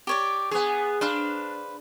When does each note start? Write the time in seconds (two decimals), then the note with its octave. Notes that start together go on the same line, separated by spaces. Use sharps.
0.07 G4 C#5 D5
0.51 B3 G#4 C#5
1.01 D4 B4 C5 F5